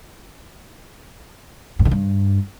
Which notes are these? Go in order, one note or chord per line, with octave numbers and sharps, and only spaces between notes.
G2
D3
G2